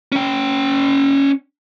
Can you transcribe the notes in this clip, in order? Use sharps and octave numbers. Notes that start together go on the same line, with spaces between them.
C#4 G5